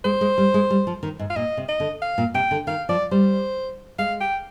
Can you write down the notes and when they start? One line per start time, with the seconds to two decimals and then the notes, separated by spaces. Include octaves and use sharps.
0.04 G#3 C5
0.21 G#3
0.38 G3
0.54 G#3
0.70 G3
0.87 F3
1.03 D#3
1.19 G#2
1.30 F5
1.36 A#2 D#5
1.57 C3
1.69 D#5
1.80 D3
2.02 F5
2.18 A#2
2.34 C3 G5
2.51 D3
2.67 D#3 F5
2.89 F3 D5
3.11 G3 C5
3.99 G#3 F5
4.21 G5